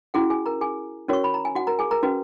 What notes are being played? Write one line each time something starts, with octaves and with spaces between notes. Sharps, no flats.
C#4 E4 F#4 G#4 F#5
G#4 G#5
A#4 A#5
G#4 G#5
C#4 F#4 A#4 C#5 C#6
B5
A#5
G#5
F#4 F#5
A#4 A#5
G#4 G#5
A#4 A#5
C#4 F#4 B4